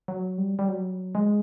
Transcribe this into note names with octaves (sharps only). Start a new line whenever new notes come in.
F#3
G3
G3
F#3
G#3